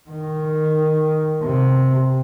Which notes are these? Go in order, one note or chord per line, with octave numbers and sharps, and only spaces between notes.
D#3
C3